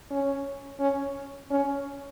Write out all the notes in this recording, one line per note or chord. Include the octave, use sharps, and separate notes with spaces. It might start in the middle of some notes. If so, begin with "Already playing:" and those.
C#4
C#4
C#4